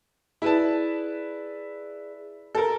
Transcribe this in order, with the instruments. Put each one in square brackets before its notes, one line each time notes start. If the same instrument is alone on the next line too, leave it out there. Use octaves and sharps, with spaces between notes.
[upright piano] E4 B4 A5 [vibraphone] G#4 D5
[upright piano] A4 A#4